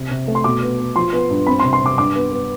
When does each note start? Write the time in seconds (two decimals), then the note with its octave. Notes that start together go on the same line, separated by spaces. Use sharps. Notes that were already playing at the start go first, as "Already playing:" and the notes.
Already playing: C3
0.11 C3
0.28 A3
0.35 C6
0.44 B2 D6
0.62 B3
0.79 B3
0.96 F3 C6
1.13 B3
1.30 G2
1.47 C4 B5
1.59 C6
1.64 C3
1.73 C6
1.81 C3 D6
1.98 G2 D6
2.15 B3
2.32 B3